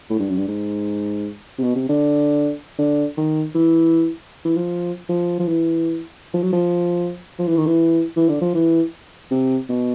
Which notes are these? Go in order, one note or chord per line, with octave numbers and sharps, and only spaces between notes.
A2
G2
F#2
G2
G#2
C3
B2
C3
D3
D3
D#3
E3
E3
F3
F3
F3
E3
F3
F#3
F3
F3
E3
D#3
E3
E3
D3
F3
E3
C3
B2